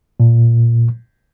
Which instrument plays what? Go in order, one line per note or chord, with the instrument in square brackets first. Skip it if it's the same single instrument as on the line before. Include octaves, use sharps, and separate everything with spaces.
[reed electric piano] A#2